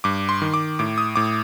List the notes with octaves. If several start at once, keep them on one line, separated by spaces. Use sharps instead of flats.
G2 D6
C6
D#3
D6
A2 D6
D#6
A2 D6